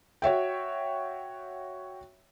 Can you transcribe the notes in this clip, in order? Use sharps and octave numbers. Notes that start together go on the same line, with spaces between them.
F#4 C#5 E5 G5